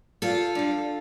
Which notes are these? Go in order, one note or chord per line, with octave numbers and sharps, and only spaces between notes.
E2 F4 A4
D3 G3